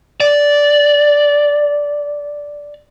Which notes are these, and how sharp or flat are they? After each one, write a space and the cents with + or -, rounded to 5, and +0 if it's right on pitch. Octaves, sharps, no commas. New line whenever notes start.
D5 -10